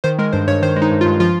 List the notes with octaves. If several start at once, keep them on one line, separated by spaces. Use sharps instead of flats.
D#3 C5
G#3 A#4
G2 C5
G2 C#5
D#3 C5
G#3
D#4
G2
F4
G2
F3 F4